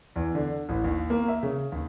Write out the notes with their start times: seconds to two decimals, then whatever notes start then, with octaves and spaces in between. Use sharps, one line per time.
0.16 E2
0.35 D3
0.69 A1
0.84 D#2
1.10 A#3
1.28 E5
1.43 C#3
1.72 D#2